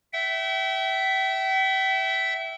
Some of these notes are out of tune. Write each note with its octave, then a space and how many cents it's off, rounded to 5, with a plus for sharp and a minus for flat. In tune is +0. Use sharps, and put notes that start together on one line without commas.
E5 +0 G5 -40